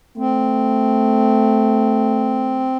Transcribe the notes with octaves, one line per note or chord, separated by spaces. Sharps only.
A3 C4